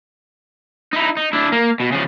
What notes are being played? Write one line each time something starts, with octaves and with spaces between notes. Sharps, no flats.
D#4 E4
D#4
D4 E4
A#3
B2
C#3 F3